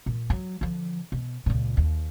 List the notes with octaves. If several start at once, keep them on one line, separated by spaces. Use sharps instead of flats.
A#2
F#3
D3 F3
B2
C#2 A#2
D#2